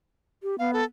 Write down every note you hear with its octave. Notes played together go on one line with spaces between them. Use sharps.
G4
B3 F5
A4